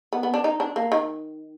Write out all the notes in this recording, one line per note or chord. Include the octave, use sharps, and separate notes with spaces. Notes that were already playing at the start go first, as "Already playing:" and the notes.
B3
B3
D4
D#4
D4
A#3
D#3